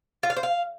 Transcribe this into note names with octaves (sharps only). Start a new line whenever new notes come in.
F4
F5
C5
F5